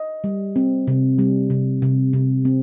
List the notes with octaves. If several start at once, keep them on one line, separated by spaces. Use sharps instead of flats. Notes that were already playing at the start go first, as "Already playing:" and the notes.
Already playing: D#5
G3
C4
C3
G3
C3
C3
C3
C4